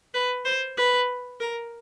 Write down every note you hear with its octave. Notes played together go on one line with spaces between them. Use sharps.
B4
C5
B4
A#4